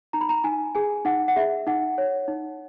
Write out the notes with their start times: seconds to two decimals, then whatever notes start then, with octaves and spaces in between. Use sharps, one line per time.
0.13 D#4 A#5
0.21 B5
0.29 A#5
0.44 D#4 G#5
0.75 G#4 G#5
1.05 D#4 F#5
1.28 F#5
1.36 G#4 E5
1.67 D#4 F#5
1.98 C#5
2.28 D#4